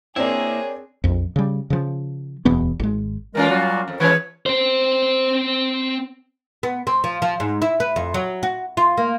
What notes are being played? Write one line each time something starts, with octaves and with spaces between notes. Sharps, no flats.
A#3 C4 D4 E4 G#4 A#4 C#5
A#1 F2
C#3 G3
C#3 F3
D1 E2 B2 B3
G#1 G#3
A#2 E3 G#3 C#4 F4 A#4
F#3 G3 F#4
F2
E3 G#3 C#4 B4 C#5
C4 C5
B3
C4
F3
F3
G#2
E4
B4
F2
F#3
F#4
F4
A#3